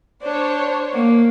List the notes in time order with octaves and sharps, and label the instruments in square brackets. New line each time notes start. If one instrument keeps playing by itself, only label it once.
[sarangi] D4 [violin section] C5 C#5
[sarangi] A#3